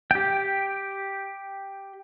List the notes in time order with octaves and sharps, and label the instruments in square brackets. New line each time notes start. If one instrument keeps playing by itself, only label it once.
[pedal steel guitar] G4 G5